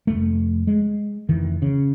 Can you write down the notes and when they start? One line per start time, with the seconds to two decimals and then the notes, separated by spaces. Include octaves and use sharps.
0.07 F1 A3
0.67 G#3
1.29 F1 D#3 E3
1.62 C#3